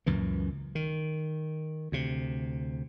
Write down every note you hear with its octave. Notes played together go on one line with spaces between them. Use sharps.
C#2 F#2 A#2 E3
D#3
D2 C3